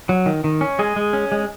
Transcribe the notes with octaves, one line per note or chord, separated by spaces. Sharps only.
F#3
D#3
D#3
C#4
G#3 G#4
G#3
C#4
G#3